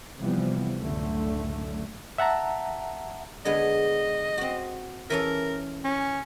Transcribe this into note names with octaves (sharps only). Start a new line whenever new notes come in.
C3 E3 F3 G3 B3
C#2 F#2 A2 D3 A3
E5 F#5 A5 A#5
D3 G#3 B3 D#5
C4 F#4
E3 C#4 A4 A#4
C#4